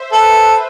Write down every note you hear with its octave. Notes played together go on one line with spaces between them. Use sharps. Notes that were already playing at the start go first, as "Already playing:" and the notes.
Already playing: C5 E5
A4 B4